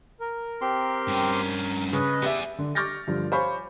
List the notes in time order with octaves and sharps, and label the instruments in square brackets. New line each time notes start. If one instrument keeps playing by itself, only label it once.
[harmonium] A#4
[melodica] C4 G4 C6
[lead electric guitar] G2 C#4
[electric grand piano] C#3 [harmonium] B4 D#5 [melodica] C#6
[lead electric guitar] B3 G#4 [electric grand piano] G4 E5 [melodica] D5
[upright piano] D3
C#6 D6 F6 G6 A6 A#6
G2 D3 F3
C5 C#5 F5 G#5 B5 C#6